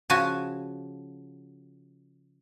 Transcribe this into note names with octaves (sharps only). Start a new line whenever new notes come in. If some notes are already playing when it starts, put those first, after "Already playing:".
C#3 F3 F#4 G#5 A5